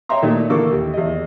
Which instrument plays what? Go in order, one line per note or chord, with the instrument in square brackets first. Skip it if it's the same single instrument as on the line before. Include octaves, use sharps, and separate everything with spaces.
[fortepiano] C#5 D#5 E5 G5 A#5 C6
A#2 D#3 A3
D3 E3 A#3 A4 C#6 D6
D#2
E2 D#5